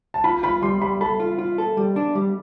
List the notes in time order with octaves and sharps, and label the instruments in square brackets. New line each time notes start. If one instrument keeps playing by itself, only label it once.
[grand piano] A5
[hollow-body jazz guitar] F4 [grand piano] B5
[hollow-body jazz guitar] F4 [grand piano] B5
[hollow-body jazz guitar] G3 [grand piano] C6
[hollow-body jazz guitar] G3 [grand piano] B5
[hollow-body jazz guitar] A4 [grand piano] B5
[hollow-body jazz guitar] F4
F4
A4
G3
D4
G3